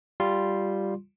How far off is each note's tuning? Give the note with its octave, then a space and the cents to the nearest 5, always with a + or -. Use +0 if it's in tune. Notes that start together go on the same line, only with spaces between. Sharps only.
G3 +0 F4 +0 C6 +0